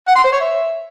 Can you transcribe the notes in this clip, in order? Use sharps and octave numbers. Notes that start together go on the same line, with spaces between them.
F#5
C6
C5
C#5
E5